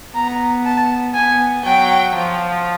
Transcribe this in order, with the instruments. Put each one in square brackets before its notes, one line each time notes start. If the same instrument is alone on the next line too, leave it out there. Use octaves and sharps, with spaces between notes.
[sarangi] B3 [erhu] A#5
[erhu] A5
[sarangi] B3 [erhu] G#5
[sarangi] F#3 [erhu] G5
[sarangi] F3